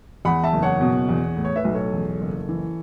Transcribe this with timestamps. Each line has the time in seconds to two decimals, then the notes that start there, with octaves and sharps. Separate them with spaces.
0.25 E2 F#5 B5
0.44 E5 A5
0.53 F#1
0.62 C#5 F#5
0.81 B2
1.09 E2
1.37 A2
1.45 C#5
1.56 B4 E5
1.65 B1
1.74 A4 C#5
1.93 E2
2.20 F#1
2.49 E3